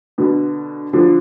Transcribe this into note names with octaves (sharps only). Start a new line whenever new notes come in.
B2 D3
D3 F3